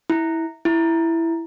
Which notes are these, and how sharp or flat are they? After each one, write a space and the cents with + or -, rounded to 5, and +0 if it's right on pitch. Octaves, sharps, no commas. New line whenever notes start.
E4 -15
E4 +5